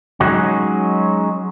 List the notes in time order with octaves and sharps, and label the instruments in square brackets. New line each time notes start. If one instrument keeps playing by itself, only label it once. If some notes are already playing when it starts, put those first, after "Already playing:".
[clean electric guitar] F#3 G#3 C#4 D#4 F#4